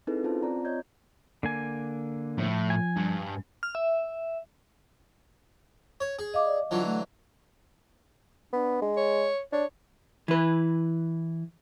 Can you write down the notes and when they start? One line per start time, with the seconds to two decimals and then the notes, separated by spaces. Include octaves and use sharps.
0.07 C4 D#4 E4 G#4 A4 B4
0.24 C#4 F4 C5 A5
0.43 C4 F4 D5 A#5
0.65 C#5 D#5 G6 G#6
1.43 D3 A#3 G#5
2.38 A2 F3
2.70 G#5
2.97 G2
3.63 F6
3.75 E5
6.00 C#5
6.19 G#4
6.34 D#5 F5 D6
6.46 D5
6.71 D3 E3 F#3 F4
6.86 A3
8.53 B3 D4
8.82 G#3
8.97 C#5
9.53 D4 C#5
10.28 E3 B4